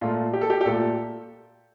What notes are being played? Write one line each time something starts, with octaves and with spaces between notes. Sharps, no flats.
A#2 A3 F4
G4
A4
G4
G4
A#2 A3 A4